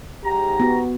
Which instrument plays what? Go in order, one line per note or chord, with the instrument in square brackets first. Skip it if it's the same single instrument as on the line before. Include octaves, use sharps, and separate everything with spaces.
[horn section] G#2 A#5 [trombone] G4
[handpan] B3 F#4